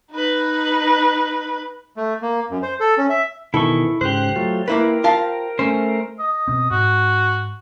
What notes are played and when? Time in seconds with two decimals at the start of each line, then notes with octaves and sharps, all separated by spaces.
0.12 D#4 B4
1.97 A3
2.22 A#3
2.50 F#2
2.62 C5
2.80 A4
2.98 C#4
3.10 E5
3.54 B2 D#3 E3 E4 A4 C#6
4.01 G#2 C#3 G4 C5 F#6
4.36 F#3 A3 F4
4.68 A#3 E4 A#4 B4
5.04 F4 F5 A5
5.59 A3 C#4 C5
6.19 D#5
6.48 B2 C4
6.71 G#2 F#4